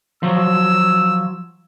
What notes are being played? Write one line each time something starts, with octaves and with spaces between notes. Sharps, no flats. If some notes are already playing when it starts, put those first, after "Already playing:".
F3 F#3 E6